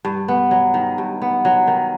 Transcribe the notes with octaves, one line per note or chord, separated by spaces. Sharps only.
G2
B3
F#3
D#3
G2
B3
F#3
D#3